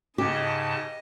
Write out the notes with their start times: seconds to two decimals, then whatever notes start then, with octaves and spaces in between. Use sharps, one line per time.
0.18 G#2 C#3 G4 D#5 A5